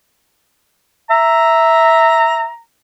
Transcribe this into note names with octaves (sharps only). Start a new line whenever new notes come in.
E5 A#5